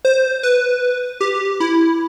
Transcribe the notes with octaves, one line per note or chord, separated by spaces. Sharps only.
C5
B4
G4
E4